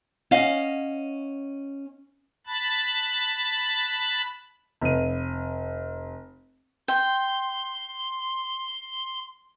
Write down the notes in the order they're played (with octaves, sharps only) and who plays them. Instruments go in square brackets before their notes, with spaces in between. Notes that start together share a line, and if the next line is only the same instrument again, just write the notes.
[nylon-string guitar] C#4 D#5 F5 F#5
[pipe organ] A5 B5 F#6 A6
[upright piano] F1 D#7
[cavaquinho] G5 [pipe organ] C6